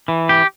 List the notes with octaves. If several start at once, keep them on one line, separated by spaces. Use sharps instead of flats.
E3
G4